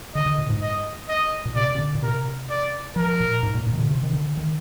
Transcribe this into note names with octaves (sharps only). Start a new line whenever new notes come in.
D3 D#5
D3
A#2
G#2
D#5
D#5
A#2
C3 D5
C3
D3
A#2
C3 A#4
D5
F3 A#4
A#2
G#2
A#2
A#2
D#3
D3
C3
D#3
D3
D#3